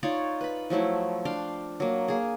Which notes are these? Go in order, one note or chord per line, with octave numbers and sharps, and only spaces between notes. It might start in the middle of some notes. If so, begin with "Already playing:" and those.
D#4 F4 C#5 D5
B4 B5
F3 F#3 A3 E4
D4 F5 G5 C6
F#3 A#3
A#3 G#4